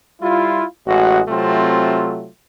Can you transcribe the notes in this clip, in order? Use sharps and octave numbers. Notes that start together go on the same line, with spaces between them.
G3 E4 F4
A1 G#3 F#4
C3 F#3 A3 C4 F4